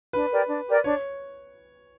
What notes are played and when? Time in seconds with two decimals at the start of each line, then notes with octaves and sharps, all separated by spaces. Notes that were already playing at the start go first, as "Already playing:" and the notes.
0.13 D4 B4
0.32 G4 A#4 D5
0.48 D4
0.66 G4 A#4 D5
0.84 D4 C#5